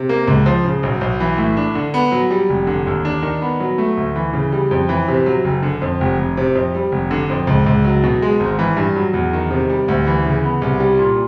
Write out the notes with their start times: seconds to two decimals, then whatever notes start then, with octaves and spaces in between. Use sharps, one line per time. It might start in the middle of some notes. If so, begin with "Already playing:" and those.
Already playing: C3
0.09 A#3
0.28 C#2
0.46 F3
0.64 C#3
0.83 B1
1.01 B1
1.20 E3
1.38 A2
1.57 D4
1.75 D3
1.94 B3
2.12 F#3
2.30 G3
2.50 F1
2.67 D3
2.87 D#2
3.05 D4
3.22 D#3
3.42 B3
3.60 F#3
3.78 A3
3.97 D2
4.16 E3
4.33 C#3
4.52 G3
4.71 F2
4.89 E3
5.08 C3
5.26 F#3
5.45 F#1
5.63 D3
5.82 F2
6.01 F1
6.19 F1
6.37 C3
6.55 F2
6.75 G3
6.92 F1
7.11 D3
7.30 F2
7.47 C#2
7.66 C#2
7.84 F#3
8.03 B2
8.22 G#3
8.40 G#1
8.59 E3
8.77 G2
8.96 F#3
9.14 E2
9.33 D#3
9.51 C3
9.69 G3
9.88 D2
10.07 E3
10.26 C#3
10.44 B3
10.62 C2
10.80 G3
10.99 A#2